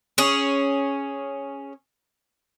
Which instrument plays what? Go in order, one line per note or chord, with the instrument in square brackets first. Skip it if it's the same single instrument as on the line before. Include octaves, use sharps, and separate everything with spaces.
[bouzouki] C#4 G#4